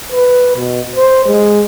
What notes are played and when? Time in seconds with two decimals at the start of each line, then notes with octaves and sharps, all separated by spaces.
0.12 B4
0.57 B2
0.96 C5
1.26 G#3